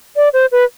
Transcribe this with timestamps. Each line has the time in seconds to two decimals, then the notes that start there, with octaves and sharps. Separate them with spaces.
0.16 D5
0.33 C5
0.52 B4